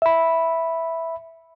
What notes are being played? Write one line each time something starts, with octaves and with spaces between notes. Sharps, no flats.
E5 B5